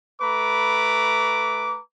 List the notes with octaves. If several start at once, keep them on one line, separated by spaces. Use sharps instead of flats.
A3 B4 A#5 B5 D6